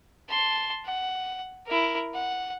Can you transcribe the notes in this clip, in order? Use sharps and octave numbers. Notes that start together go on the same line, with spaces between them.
A5 C6
F#5
E4 A#4
F#5